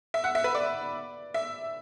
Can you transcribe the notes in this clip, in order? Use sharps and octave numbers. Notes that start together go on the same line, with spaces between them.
E5
F#5
E5
B4
D5
E5